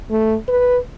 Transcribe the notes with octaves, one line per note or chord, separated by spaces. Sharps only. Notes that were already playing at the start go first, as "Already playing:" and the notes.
A3
B4